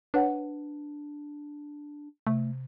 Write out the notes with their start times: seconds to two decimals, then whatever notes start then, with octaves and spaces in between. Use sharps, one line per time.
0.14 D4 B4 C#5 F#5
2.27 C3 A3